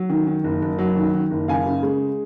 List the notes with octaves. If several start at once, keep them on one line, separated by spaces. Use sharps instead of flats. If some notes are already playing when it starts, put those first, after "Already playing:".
Already playing: F#3
D#3
D#3
F#1
F#1
F#3
D#3
D#3
F#1
C#3 F5 G#5
C#3
G#3